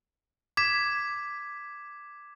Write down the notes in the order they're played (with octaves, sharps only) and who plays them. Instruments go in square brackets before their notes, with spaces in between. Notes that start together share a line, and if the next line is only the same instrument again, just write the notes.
[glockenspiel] D6 G#6 B6 E7